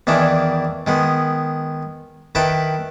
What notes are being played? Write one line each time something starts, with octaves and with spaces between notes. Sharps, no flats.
E2 D#3 D4 E4 G#5
D#3 G#3 B3
D#3 E4 A4 B4 G5